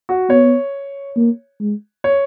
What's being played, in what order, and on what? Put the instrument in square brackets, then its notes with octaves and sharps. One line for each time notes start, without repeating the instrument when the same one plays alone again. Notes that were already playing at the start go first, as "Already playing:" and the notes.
[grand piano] F#4
[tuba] B3 [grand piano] C#5
[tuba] A#3
G#3
[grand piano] C#5